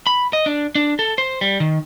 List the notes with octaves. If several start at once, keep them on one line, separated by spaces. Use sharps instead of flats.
B5
D#5
D4
D4
A4
C5
G3
D#3